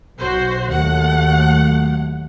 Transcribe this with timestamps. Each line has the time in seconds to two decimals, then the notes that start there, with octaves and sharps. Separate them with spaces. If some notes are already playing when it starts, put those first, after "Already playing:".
0.19 B1 F#4 C5
0.72 D#2 F#3 A3 F#5